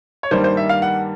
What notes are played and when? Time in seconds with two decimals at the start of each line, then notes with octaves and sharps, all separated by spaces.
0.23 C#5
0.31 G2 D#3 G3 A#3 C5
0.44 C5
0.57 E5
0.69 F5
0.82 F#5